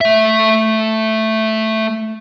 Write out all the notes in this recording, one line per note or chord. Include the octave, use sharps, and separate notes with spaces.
A3 E5